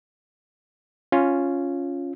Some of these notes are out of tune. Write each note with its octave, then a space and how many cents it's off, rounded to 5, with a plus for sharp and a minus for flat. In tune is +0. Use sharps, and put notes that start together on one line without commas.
C#4 +0 F4 +0